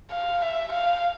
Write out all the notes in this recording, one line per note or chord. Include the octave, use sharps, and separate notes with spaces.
F5
E5
F5